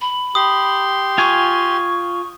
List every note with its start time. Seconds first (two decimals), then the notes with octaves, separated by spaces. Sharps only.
0.01 B5
0.35 G4 C6 D#6
1.18 F4 G#5 C#6